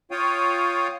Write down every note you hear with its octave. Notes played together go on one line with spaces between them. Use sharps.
F4 C#5 F5 G5 D#6